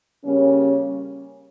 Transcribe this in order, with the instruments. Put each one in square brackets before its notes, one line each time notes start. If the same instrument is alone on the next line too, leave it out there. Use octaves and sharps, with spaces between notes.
[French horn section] C#3 G3 A#3 C#4